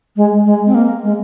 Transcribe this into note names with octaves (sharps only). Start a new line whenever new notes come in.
G#3
G#3
C4
A#3
G#3